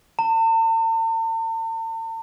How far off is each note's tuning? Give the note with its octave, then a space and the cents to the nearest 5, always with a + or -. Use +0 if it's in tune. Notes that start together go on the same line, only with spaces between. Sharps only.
A5 +45